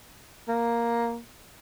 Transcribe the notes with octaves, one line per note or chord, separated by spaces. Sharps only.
A#3